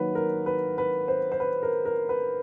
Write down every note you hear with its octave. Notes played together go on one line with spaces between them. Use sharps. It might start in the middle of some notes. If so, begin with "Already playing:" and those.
Already playing: D#3 F#3 A#3 B4
A#4
B4
B4
C5
C5
B4
A#4
A#4
B4